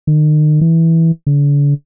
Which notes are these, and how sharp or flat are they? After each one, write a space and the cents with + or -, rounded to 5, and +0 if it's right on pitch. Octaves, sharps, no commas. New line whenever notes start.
D#3 -40
E3 -10
D3 -40